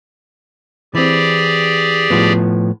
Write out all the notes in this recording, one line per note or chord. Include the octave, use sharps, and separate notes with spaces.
E3 C4 G4 G#4 D5
A2 F3 B3